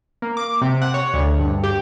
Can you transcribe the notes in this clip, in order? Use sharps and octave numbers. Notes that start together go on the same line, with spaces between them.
A#3
D6
C3
F#5
C#5
D2
G2
G4